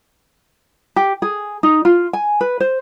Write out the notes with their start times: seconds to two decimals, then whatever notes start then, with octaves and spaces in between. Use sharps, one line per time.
0.96 G4
1.22 G#4
1.63 D#4
1.85 F4
2.13 G#5
2.41 B4
2.60 C5